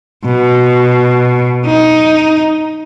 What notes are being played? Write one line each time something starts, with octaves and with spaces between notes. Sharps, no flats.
B2
D#4